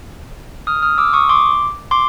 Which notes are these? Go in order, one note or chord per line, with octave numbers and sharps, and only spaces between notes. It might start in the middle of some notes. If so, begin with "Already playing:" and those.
D#6 F6
D#6 F6
D6 E6
C#6 D#6
C6 D6
C6 D6